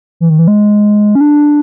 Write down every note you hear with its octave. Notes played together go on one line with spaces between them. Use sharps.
E3
D#3
E3
G#3
C#4
D4